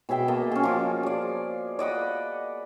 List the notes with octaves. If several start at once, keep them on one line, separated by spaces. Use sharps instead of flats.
B2 G#4 E5 G5
A#3 D#5 A5
C#4 G#4
F3 D6
G#4 D5
D5 D#5 F#5 B5